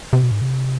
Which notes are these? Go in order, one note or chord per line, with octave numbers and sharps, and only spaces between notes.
C3
B2
G#2
C3